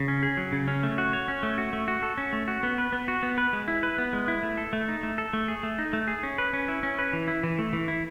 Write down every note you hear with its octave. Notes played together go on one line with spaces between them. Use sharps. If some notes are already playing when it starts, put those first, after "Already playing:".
Already playing: C#3
C#4
G#4
F#3
C#3
C#4
A3
F#4
C#5
C#4
A3
F#4
A3
F#4
A4
C#4
A3
F#4
B3
B4
B3
F#4
B3
B4
G#3
E4
B4
B3
G#3
E4
A3
A4
A3
D#4
A3
A4
A3
G#4
A3
D#4
A3
G#4
C#4
B4
C#4
E4
C#4
B4
E3
E4
E3
A3
E3
E4